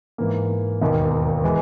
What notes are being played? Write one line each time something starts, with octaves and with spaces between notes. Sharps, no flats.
G#2 E3 A#3
E1 D#2 D#3 A#3 D#4
E3 G#3